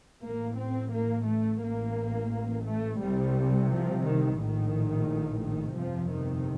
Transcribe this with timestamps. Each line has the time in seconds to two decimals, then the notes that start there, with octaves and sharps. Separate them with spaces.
0.23 A1 A2 A#3
0.57 C4
0.92 A#3
1.26 A3
1.61 A1 A2 A#3
2.65 A3
2.99 C2 C3 G3
3.68 F3
4.02 D#3
4.37 A#1 A2 D#3
5.40 D#3
5.75 G1 F2 C3 F3
6.10 D#3